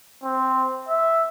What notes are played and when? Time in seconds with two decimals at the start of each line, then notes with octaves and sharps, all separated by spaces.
0.24 C4
0.89 E5